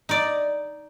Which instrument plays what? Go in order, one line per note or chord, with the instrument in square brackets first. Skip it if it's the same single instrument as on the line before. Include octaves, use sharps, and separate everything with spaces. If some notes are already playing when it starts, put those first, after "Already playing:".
[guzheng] D#4 D5